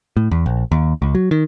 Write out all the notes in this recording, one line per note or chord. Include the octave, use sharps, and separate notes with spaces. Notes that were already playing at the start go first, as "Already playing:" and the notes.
A2
E2
A#1
D#2
C#2
F#3
D#3